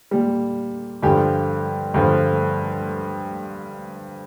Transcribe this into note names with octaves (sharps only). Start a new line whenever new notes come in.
A#2 G3
G2 D3 F3 G4
G2 D3 F3